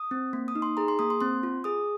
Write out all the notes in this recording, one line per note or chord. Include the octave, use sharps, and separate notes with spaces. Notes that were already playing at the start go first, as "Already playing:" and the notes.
Already playing: D#6
C4
A#3
D#6
D#4
C6
G#4 A#5
C6
A#3 D#6
C6
C4 C6
F4
G#4 D#6